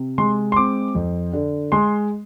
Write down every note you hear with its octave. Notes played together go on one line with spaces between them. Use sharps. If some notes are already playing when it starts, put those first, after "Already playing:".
Already playing: C3
G#3 C6
C6
C4 D6
F2
D3
G#3 C6